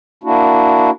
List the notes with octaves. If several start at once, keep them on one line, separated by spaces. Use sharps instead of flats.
A#3 D4 E4 F#4